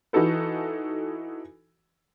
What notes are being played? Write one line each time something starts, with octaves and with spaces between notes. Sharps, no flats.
E3 D#4 F#4 A4 B4